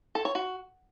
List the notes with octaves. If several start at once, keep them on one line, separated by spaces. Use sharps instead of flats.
A4
C#5
F#4